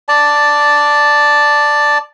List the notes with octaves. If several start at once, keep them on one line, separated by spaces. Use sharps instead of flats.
D5 A5